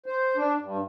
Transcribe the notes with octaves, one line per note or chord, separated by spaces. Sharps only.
C5
D4
G2